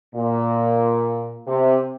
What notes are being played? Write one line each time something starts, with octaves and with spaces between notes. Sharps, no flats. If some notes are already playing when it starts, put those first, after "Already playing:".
A#2
C3